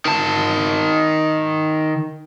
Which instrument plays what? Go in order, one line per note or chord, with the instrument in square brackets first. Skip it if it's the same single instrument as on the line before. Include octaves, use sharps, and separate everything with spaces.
[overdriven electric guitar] D#3 A5